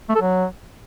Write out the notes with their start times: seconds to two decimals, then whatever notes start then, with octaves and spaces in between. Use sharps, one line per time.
0.09 A3
0.15 A4
0.22 F#3